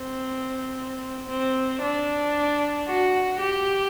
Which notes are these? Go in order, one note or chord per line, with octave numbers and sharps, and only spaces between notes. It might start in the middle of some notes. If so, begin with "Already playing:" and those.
Already playing: C4
C4
D4
F#4
G4